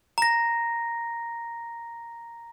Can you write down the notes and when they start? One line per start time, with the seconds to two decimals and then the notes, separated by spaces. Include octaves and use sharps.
0.18 A#5 A#6